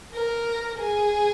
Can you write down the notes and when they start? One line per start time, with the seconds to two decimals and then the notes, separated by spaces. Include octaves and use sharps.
0.14 A#4
0.79 G#4